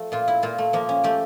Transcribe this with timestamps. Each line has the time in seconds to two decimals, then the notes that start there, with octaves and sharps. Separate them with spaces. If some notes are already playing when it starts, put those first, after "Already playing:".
Already playing: F3 A3
0.12 A#2 F4
0.28 E4
0.42 A#2 F4
0.58 A3
0.73 F3 A#3
0.89 C#4
1.04 A3 G4